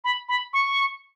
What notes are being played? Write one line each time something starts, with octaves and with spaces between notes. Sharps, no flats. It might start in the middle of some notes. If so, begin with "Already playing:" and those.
B5
B5
C#6